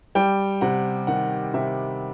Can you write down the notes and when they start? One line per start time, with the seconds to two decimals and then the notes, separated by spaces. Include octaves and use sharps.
0.15 G3 G5
0.61 C3 F#5
1.07 D#3 F#5
1.54 C3 E5